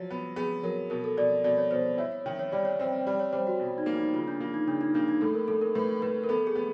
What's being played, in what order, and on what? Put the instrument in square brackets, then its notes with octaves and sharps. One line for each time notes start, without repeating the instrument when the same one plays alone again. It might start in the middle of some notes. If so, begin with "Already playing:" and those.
Already playing: [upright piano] F3 F#3
B3
[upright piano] B3 [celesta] G#4
[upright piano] F#3 [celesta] A#4
[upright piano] B2 [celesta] A#4
[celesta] A4
[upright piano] B2 [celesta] D5
[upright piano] B2 [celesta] D5
[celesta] C#5
[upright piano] B2 [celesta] C5
[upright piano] E4 [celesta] C#5
[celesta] C#5
[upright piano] D#3
[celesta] C#5
[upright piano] G3 [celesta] D5
[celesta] C#5
[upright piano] C4 [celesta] C5
[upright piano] G3 [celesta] D5
[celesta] C#5
[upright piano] G3 [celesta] C5
[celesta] F#4
[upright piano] B2
[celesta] D#4
[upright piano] A#3
[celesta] D#4
[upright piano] C#3 [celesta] F4
[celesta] D4
[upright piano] A#3
[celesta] D#4
[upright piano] C#3 [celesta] D4
[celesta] D#4
[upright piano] A#3 [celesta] D4
[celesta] D#4
[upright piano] A2 [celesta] A4
[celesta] A#4
[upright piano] A2 [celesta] A4
[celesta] A#4
[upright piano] A2 [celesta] B4
[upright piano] A2 [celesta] B4
[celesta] A#4
[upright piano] B3 [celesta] A4
[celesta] G#4
[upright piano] B3